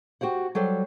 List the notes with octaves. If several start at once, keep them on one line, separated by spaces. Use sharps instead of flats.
F#4 G4 C5 F#5
F#3 G3 A4 C5